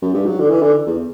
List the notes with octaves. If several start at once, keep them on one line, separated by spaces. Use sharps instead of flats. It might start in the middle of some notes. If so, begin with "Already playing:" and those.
F#2
G2
F#3
D3
E3
D3
E2